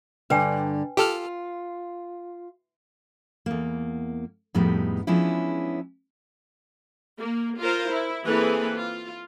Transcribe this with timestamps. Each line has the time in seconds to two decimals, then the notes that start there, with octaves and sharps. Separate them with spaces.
0.30 G2 D3 B4 G5 G#5
0.97 F4 G4 A4 F6
3.46 E2 A#3
4.55 F2 A2 G3 G#3 B3 D#4
5.07 F3 G#3 B3 C#4 D4 E4
7.18 A#3
7.58 F4 A#4 C5
7.88 E4
8.25 E3 A#3 C4 G#4 A4 B4
8.77 F4